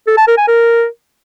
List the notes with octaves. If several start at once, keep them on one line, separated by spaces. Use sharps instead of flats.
A4
A5
A#4
G#5
A#4